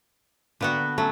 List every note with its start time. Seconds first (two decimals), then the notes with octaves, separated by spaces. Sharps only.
0.61 D3 A#3 B3 F#4 B4 G5
0.98 F#3 A3 C#4 A4